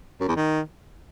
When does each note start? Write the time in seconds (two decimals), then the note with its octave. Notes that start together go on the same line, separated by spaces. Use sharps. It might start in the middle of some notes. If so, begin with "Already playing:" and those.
0.21 F#2
0.28 E2
0.36 D#3